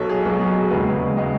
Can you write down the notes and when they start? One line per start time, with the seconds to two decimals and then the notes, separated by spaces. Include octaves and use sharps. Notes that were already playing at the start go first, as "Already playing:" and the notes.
Already playing: B1 B2 F#3 A4 C#5
0.10 G#4
0.25 B1 B2 F#3
0.40 G#4
0.56 G#4
0.70 E1 D#2 C#3 G#3 B4
1.17 C#3 G#3 D#5